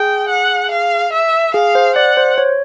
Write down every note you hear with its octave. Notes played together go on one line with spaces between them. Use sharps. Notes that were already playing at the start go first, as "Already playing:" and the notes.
Already playing: G#4 G5
F#5
F5
E5
G#4 F5
C5
D5 F#5
C5
C#5